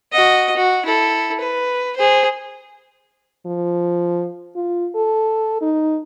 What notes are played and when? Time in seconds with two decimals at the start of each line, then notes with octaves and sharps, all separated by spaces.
0.12 F#4 D#5
0.56 F#4
0.85 E4 A4
1.40 B4
1.96 G#4 C5
3.46 F3
4.56 F4
4.95 A4
5.62 D#4